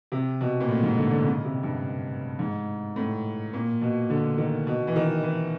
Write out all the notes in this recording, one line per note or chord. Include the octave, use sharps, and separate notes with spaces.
C3
B2
A#2
A2
G#2
D3
D3
C#3
C3
G2
G#2
A2
A#2
B2
D3
D#3
B2
E3
D#3
E3